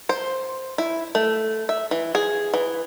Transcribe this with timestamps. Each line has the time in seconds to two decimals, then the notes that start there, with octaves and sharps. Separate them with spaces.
0.09 C5
0.78 E4
1.15 A3
1.69 E5
1.91 E3
2.15 G#4
2.54 E3